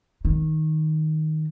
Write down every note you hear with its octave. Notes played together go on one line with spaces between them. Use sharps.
D#3